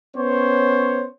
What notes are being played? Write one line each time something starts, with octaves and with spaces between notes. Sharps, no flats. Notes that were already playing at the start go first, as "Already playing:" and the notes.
B3 C#4 C5 C#5